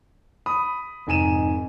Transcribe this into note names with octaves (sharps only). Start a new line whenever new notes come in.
B5 D#6
F1 G#2 G#5 D#7 E7